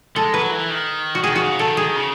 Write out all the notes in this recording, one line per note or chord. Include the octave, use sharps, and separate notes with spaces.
G#3 A4
F#3 B4
E3
D#3
F#4
D#3 G#4
F#4
C#3
D#3 A4
G#4
C#3